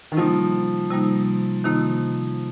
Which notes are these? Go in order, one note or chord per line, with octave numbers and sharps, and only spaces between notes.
D#3
C3 F3 G3 A#3 D#4
C3 G3 A#3 D#4
C3 D#3 F3 A#3 D#4